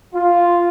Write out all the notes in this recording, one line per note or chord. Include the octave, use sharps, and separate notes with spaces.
F4